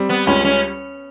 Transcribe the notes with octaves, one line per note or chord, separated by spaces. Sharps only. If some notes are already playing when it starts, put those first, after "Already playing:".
Already playing: G3 C4
B3
C#2 C#4
C#4